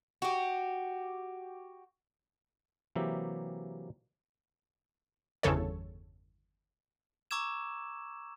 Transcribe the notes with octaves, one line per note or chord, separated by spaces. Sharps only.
F#4 G4
C3 E3 F#3 A#3 G4 E5
G1 E2 C#3 A4 C#5
A#5 C#6 D6 E6 G#6 E7